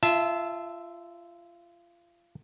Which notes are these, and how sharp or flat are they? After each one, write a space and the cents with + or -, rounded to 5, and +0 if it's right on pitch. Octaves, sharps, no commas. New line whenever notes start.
F4 -25 E5 +0 A5 +0